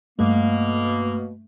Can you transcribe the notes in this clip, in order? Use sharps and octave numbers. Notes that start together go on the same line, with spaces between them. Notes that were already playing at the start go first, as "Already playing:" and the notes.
G2 B2 A3 A#3